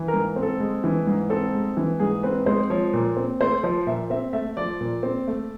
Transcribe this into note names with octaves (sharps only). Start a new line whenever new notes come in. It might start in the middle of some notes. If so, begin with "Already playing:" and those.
Already playing: E3
A#4
G#2
C4
A4
G#3
E3
G#2
C4 A4
G#3
E3
G#2 G#4
C4 B4
G#3 C5
F3 C#5
A#2
C4
A3 C5
F3 C5
A#2 E5
C4 E5
A3 E5
F3 D5
A#2
C4
A3